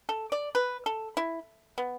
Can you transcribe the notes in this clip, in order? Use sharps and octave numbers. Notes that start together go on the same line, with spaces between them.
A4
D5
B4
A4
E4
B3